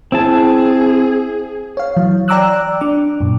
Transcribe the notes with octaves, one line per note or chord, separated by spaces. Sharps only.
C4 E4 G#4 A5
C#5 F5
E3 F#3
D5 G5 A#5 D6 E6 F#6
D4 D6
F#2 A#2